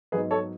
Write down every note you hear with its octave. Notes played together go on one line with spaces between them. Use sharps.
G#2 F#3 B3 D#4 G#4 B4
A4 C#5